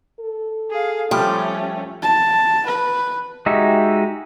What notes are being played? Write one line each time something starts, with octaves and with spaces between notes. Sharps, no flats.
A4
G#4 F5
F3 G3 A3 C#4 G4
A5
B4
G#3 D#4 F#4 G4 E5